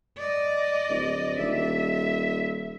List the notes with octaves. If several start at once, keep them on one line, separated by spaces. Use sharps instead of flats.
D5 D#5
D1
D#1 E5